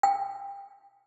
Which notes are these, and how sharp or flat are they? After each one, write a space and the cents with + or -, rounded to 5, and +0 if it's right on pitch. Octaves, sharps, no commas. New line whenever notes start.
G5 +20